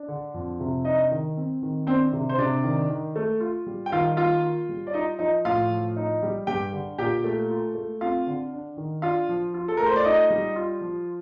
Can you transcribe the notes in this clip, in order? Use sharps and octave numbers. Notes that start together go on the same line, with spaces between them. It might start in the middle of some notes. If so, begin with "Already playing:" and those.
Already playing: D4
D3
F2
C3
D4 D#4 D#5
D#3
C4
D#3
C4 D4 C5
C3
C5
C3 D4 D5
D#3
D#3
A3
F4
G3
G5
D#3 F4 F5
A#3 F4 F5
F4
G3
D5
D#4 F4 D#5
F3 D#4 D#5
A2 F4 F5
F3
D#4
G3
G2 G4 G5
D3
A#2 G4 G5
A3
F4
A3
C4 F4 F5
D3
D4
D#3
D4 F4 F5
F3
F4
A4
A3 A#4
C5
D5
D#4 F4 D#5
G3
F4
F3